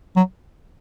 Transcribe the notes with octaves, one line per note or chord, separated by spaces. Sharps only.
F#3